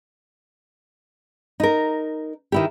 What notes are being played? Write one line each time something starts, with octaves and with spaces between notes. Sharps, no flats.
D#4 A#4
D#3 E4 G4